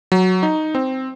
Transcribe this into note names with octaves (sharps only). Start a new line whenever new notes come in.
F#3
D#4
C4